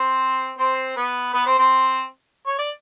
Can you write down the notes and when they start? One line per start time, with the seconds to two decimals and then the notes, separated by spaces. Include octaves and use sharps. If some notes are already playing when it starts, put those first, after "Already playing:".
Already playing: C4 C5
0.58 C4 C5
0.96 B3 B4
1.34 B3 B4
1.46 C4 C5
1.58 C4 C5
2.47 C#5
2.58 D5